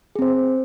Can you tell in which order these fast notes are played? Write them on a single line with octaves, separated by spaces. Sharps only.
G#4 C4 C5